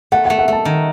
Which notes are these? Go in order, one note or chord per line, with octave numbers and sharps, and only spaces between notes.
A3 F#5
F#5
A3
F#5
A3 A5
D#3